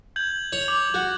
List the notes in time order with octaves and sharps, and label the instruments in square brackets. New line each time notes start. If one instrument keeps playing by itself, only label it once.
[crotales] G6 G#6 F#7
[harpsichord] C#5 [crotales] F7
[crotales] D6 F#7
[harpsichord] F#4